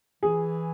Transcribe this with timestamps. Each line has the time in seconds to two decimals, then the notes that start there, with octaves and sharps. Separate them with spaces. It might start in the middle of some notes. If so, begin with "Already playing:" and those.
0.23 E3 G#4